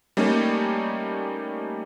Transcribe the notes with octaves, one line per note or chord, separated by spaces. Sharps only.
G3 A3 A#3 C#4 D#4